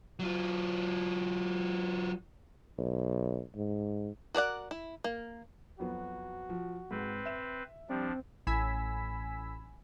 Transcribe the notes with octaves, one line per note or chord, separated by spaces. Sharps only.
F#3 F4
B1
G#2
F#4 A#4 D5 F#5
E4
A#3
F2 F#3 B3 F#4
F3
G#2 C4 B4
E5 E7
F3 G3 C4 D4
A1 G#5 B5 E6 B6